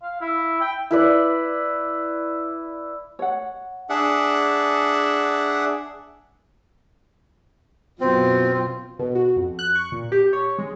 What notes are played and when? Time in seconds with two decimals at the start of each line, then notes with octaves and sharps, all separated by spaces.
0.02 F5
0.21 E4
0.61 G5
0.91 E4 B4 D5
3.19 C#5 F#5
3.90 D4 G#4 E5 F#5
8.01 F#2 B2 C4 F4
8.99 B2
9.15 F#4
9.36 F2
9.59 F#6
9.75 C#6
9.92 A#2
10.12 G4
10.33 C#5
10.58 G#3